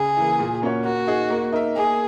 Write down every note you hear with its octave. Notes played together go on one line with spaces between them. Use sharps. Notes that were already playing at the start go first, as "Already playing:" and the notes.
Already playing: C#3 G#4
E3 A#3
A#2
A#3 C#4 F#4 C#5
A#3 F#4
D#4 G#4
A#3
D#4 A#4 E5
A#3 G#4